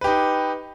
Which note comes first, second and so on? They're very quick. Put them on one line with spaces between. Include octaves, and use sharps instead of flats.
B4 G4 D#4